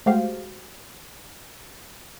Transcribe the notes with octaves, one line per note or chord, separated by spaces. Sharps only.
G#3 A3 F#4 G4 C5 F5